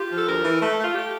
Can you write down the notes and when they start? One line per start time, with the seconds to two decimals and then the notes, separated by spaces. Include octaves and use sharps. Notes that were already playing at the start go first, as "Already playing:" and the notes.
Already playing: F4 G4
0.11 F3
0.17 A4
0.27 D2 A#4
0.44 E3
0.61 A3 A4
0.78 A3
0.84 F4
0.95 A3 G4